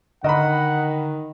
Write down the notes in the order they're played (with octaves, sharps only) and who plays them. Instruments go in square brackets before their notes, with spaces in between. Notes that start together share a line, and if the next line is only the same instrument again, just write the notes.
[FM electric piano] D3 [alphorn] D#3 [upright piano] D#5 A#5 B5 [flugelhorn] F#5